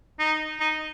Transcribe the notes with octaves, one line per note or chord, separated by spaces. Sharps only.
D#4
D#4